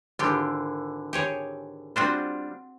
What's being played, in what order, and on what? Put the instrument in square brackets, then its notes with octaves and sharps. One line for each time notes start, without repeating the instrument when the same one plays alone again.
[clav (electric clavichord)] G#1 D3 E3 [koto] F4 G4
[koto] G4 G#4 C#5
[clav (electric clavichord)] G3 D4 F4 [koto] C4 F#4 C5